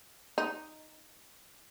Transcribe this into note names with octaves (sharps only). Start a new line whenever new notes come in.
D#4